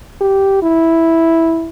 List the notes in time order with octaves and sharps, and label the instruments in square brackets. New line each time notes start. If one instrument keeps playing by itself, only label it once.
[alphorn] G4
E4